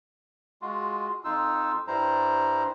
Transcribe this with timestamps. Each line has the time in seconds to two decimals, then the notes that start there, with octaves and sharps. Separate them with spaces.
0.62 G#3 F4 F#4
1.24 F2 D#4 F4 E6
1.87 G2 G3 E4 C5 A#5